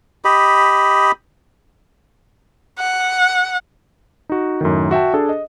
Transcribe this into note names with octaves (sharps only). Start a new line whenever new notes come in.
G4 D#5 B5
F#5
D#4 F#4
F#2 A2 D#3
F#4 E5 G5 A5
D4 G#4 A4
D#5